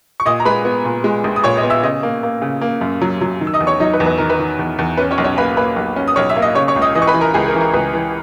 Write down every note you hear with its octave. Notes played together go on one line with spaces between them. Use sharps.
C#6
A#2 D#5 D#6
A#5
G#3 B4 B5
B3
A#2
G#3
A#1
D#6
A#2 C#5 C#6
D#5 D#6
B3
E5 E6
C#3 D#5 D#6
A#3
A#3
C#3
A#3
F#2
F#3
F#3
D#3
E6
D#5 D#6
E2
C#5 C#6
F#3 D#4 D#5
B4
E2
B4
D#3 A#4
B4
D#3
E2
E2
C#4 B4
C#4 C#5
B1
C#4 C#5
A#3 B4 B5
A#3 B4 B5
B1
C#4
D#6
B1 C#5 C#6
E5 E6
A#3
D#5 D#6
C#3 C#5 C#6
C#5 C#6
C#2
D#5 D#6
E3 D#5 D#6
C#6
B4 B5
E3
A#4 A#5
C#2 G#4 G#5
A#4
E3
A#4
C#2 B4
E3